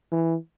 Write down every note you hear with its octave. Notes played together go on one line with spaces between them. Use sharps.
E3